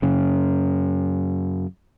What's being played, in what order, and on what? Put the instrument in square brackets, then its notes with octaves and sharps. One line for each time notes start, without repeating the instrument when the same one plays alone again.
[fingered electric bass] F#2 C#3